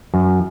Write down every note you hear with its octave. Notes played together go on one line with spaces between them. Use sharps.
F#2